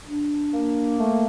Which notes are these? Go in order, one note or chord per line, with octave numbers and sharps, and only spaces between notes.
D4
A#3
A3